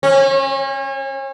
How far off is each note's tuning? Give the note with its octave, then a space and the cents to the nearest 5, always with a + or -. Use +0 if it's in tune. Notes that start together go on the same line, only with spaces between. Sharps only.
C#4 -35